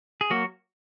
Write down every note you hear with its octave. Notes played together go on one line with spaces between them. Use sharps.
G#4
F#3 A#3 F#4